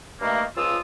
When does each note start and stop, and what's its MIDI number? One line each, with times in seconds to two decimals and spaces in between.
0.21 0.43 43
0.21 0.43 51
0.21 0.43 57
0.21 0.43 58
0.56 0.78 37
0.56 0.78 53
0.56 0.78 65
0.56 0.78 87
0.56 0.78 88